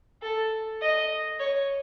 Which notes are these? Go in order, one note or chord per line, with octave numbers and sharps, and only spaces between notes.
A4
D#5
C#5